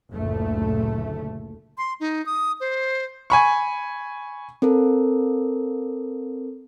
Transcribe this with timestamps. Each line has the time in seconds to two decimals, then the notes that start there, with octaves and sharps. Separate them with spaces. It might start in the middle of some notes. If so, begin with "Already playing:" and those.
0.13 F#1 D2 A#2 A3
1.78 C6
2.00 D#4
2.26 D#6
2.60 C5
3.30 G#5 B5 C#6
4.62 C4 A4 A#4